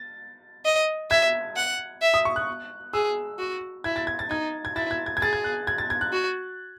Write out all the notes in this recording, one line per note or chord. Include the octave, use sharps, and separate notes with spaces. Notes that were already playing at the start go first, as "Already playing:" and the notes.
Already playing: A6
D#5
E5 G#6
F#5
E5
D#6
C#6
F#6
G#4 E6
F#4
E4 G#6
A6
G#6
A6
D#4 G#6
G#6
E4 A6
G#6
G#6
G#6
G#4 A6
G#6
F#6
G#6
A6
G#6
F#6
F#4